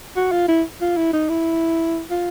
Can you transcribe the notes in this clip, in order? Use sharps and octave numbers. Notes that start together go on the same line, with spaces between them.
F#4
F4
E4
F4
E4
D#4
E4
F4